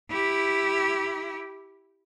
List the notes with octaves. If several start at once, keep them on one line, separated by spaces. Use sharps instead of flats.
E4 G4